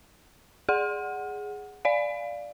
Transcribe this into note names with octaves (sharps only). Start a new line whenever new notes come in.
G#4 F#5
D5 F5